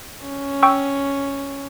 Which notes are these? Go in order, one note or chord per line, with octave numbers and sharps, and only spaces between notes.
C#4
G5 C#6 E6